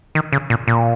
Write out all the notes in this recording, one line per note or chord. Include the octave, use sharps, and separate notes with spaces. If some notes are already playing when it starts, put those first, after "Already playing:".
D#3
C#3
A#2
A#2